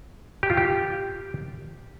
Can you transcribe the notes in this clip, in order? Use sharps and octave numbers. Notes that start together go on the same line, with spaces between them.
G4
F4
G4